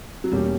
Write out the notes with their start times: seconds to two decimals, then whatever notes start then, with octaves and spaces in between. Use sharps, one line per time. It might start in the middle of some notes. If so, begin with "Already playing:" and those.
0.24 F#3
0.32 E2 B2 G3 A#3 C#4 G4